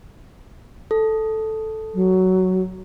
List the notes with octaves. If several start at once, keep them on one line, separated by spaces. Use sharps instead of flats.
A4
F#3